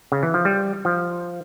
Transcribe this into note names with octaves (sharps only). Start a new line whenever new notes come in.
C#3
E3
F3
G3
F3